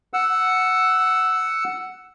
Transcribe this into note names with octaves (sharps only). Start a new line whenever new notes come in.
F#5 E6